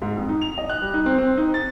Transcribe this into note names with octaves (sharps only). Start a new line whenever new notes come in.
G#2
F2
D#4
F7
D#5
F#6
G3
D#4
C4
C4
D#4
A6